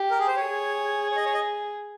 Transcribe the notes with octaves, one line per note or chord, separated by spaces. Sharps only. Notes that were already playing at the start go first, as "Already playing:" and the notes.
Already playing: G4
A#4
G#4
C5
C#5
G#4
C#5
D#5
C#5
D#5